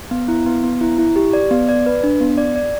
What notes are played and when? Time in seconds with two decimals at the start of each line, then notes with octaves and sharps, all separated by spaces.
0.11 B3
0.28 E4
0.46 B3
0.64 B3
0.81 E4
0.98 E4
1.16 G4
1.33 D5
1.51 B3
1.69 D5
1.86 B4
2.04 D4
2.21 B3
2.38 D5
2.56 D5